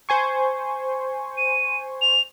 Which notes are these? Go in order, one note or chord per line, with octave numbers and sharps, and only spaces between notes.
C5 G#5 C#6
D#7
F7